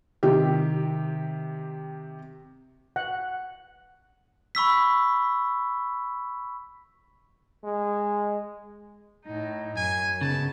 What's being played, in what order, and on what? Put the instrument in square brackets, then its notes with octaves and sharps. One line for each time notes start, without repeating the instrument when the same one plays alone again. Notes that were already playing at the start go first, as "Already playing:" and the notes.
[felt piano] C3 D#3 G4
[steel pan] F#5
[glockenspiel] B5 C#6 E6 B6
[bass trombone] G#3
[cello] A2 D#4
[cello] F#2 [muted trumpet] G#5
[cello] G#2 B3 [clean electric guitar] C#3 [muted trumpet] A5